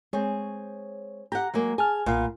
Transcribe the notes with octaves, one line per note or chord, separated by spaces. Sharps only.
G#3 C4 G#4 C#5
G4 F#5 A#5
F#3 G#3 A#3
G#4 G#5 A5 F6
B1 A#2 B3 F5